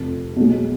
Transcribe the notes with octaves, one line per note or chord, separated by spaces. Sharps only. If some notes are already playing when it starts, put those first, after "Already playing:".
Already playing: F1 F2 C3
B1 B2 G#3